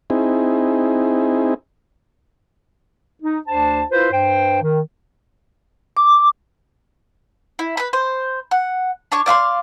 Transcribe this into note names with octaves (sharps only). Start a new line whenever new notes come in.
C4 D#4 E4 G#4
D#4
D2 D4 C5 A5
E4 F4 B4 C5
G2 C5 G5
D#3
D6
E4
B4 B5
C5
F#5
D4 C#5 C#6
D5 F5 B5 C6